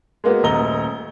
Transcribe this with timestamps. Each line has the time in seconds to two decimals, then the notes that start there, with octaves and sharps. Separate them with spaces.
0.24 G#3 A#3 B3 F#4
0.43 D#1 A3 D#5 A#5 G7